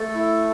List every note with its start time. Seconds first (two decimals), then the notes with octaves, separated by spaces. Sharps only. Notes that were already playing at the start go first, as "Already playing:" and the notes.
Already playing: A3 A4
0.15 E4